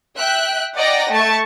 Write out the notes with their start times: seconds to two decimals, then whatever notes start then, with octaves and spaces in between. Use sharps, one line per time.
0.17 E5 G5 F#6
0.76 D5 D#5 F#5 G5 A#5 A#6
1.11 A3 A5 C#6